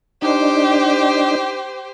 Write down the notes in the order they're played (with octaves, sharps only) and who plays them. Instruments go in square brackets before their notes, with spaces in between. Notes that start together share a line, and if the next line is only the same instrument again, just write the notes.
[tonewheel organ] D4 D#4 [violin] G4 C5